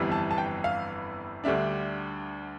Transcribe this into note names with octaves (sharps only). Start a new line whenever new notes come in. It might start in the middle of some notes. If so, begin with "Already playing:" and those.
Already playing: G1 F2 E3 G3 B3
A5
A5
G5
F5
D2 D3 G3 D4 E5